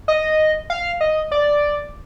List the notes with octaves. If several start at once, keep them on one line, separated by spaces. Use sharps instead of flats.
D#5
F5
D#5
D5